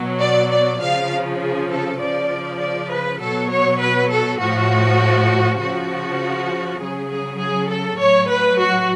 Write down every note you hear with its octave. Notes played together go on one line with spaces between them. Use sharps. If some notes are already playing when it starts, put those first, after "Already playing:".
Already playing: B2 F#3
D5
D5
C#3 F3 F5
G#4
A4
C#3 F3 D5
D5
B4
B2 F#3 A4
C#5
B4
A4
A2 F3 F#4
C#3 F3 F#4
C#3 F#3 G#4
G#4
G#4
A4
A2 F#3 C#5
B4
F#4